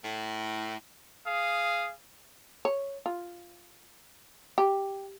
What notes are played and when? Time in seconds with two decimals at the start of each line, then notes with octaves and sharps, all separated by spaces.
0.03 A2
1.26 G#4 F5 D#6
2.65 C#5
3.06 F4
4.58 G4